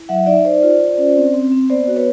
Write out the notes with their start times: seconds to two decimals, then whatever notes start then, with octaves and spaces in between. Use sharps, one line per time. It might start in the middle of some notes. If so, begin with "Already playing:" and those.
Already playing: E4
0.09 F#3 E5 F#5
0.26 D#4 D5 E5
0.44 D#4 C5 D5
0.63 F4
0.80 F4
0.98 C#4
1.17 C4
1.34 C4
1.52 C4
1.69 B3 C5 D5
1.87 F#4
1.96 B4 C#5